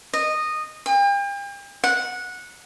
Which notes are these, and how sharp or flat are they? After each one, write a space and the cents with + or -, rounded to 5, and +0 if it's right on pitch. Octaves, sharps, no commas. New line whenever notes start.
D#5 -15
G5 +40
F#5 -15